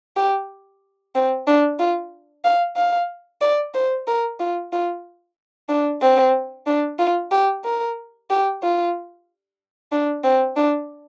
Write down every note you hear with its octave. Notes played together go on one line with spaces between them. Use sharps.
G4
C4
D4
F4
F5
F5
D5
C5
A#4
F4
F4
D4
C4
D4
F4
G4
A#4
G4
F4
D4
C4
D4